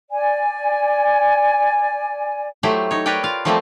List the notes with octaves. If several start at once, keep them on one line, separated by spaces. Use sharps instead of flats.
D5 G#5
F#3 A3 E4 G4 C5 E5
D#4 C#5
A#4 B4 C#5 D5 G5
F4 F5
F3 G3 A3 A#3 C4 G4